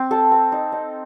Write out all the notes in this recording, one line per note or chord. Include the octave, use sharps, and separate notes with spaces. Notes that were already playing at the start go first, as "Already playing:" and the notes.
Already playing: C4
A4
C4
D#4
D#4